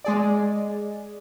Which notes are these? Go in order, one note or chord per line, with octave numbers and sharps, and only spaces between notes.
G#3 G#4 D5